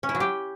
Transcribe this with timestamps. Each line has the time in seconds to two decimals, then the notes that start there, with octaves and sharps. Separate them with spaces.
0.03 C#4
0.09 E4
0.15 F#3
0.20 G4